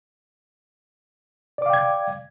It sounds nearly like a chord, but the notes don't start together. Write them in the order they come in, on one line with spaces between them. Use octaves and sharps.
D5 D6 F5 G5 G#6